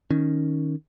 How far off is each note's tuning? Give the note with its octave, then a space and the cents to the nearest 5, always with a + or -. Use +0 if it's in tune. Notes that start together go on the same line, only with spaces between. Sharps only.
D#3 +0 C#4 +0